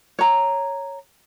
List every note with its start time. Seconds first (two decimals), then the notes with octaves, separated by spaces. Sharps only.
0.19 C#5 A#5